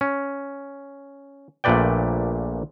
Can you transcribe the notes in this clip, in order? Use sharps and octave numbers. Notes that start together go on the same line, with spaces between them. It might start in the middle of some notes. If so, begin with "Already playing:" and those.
C#4
A#1 A#2 A3 B4 D5 G5